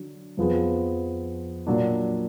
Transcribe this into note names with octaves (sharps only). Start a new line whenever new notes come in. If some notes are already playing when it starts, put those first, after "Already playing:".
Already playing: D3 F#3
F2 F3 B3 F4 G#4
A#2 F#3 D4